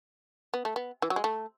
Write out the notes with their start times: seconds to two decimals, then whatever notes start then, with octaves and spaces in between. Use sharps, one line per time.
0.54 B3
0.65 A3
0.76 B3
1.02 E3
1.10 F#3
1.16 G#3
1.24 A3